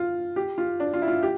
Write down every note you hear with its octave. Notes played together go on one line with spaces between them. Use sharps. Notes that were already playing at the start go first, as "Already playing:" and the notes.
Already playing: F4
G4
F4
D4
F4
E4
F4
G4